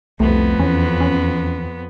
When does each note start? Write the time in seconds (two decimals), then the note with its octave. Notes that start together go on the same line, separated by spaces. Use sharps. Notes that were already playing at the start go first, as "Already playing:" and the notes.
0.20 C2 F2 A3 B3
0.59 E2 C#4
1.00 C#4